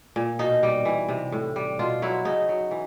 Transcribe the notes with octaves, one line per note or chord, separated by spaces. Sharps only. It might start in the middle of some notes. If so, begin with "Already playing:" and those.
A#2
B2 D#4
G3
E3
C3
A2
G3
B2 F4
F#3 E4
C#3 D#4
F#3
E3